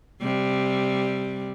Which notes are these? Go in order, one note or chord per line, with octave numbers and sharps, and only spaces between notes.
C3 G3